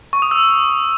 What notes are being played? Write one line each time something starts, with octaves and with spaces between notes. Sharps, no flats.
C#6
D#6
E6